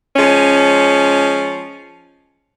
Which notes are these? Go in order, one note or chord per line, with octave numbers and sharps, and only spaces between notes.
F3 G#3 C#4